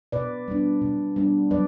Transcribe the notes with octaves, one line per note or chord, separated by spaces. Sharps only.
B2 B4 D5
G3 B3 D4
B2
G3 B3 D4
F#3 B4 D5